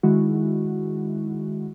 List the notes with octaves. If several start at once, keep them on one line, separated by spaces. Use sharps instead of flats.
D#3 G#3 E4 F#4